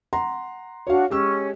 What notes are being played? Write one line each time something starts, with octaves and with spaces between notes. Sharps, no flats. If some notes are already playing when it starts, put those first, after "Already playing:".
F#5 A#5 C6
D4 F#4 C#5 F5
G#3 C#4 G4 E6